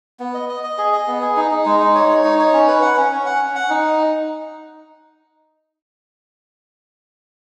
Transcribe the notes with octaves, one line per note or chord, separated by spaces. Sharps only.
B3
D#5
D#5
D#5
G#4
D#5
B3
G#4
D#4
D#4
G#3
D#4
C#5
C#5
D#4
C#5
C#4
B4
F#5
C#4
C#4
F#5
C#4
F#5
D#4